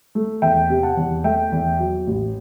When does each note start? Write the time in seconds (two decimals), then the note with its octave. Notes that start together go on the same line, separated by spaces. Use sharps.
0.15 A3
0.42 E2 E5 G5
0.69 C3
0.83 F#5 A5
0.97 E2
1.24 A3 E5 G5
1.52 E2
1.79 F#3
2.07 A1